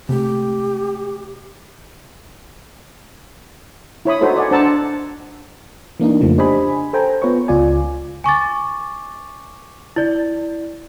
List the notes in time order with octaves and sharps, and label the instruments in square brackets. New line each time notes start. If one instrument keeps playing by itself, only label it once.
[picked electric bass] C3 G#3 A3 [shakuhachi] G4
[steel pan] E4 C#5 B5 D#6
D#4 F#4 A4 C5 C#5
D5 D#5 F#5 G#5
D4 C5 F#5 A5 A#5 E6
[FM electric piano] E3 A#3 D4 D#4
F2 C#3 F3 A3
D4 G4 C5 D#5 G#5 B5
A4 C5 G5 G#5 A#5
B3 F4 B4 C#5 C#6
C#2 C#3 F4 D5 G#5
[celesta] G#5 C#6 D6 A6
E4 D5